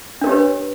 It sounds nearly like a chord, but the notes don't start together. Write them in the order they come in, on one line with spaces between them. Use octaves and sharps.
D4 A#4 G4 C#5 B4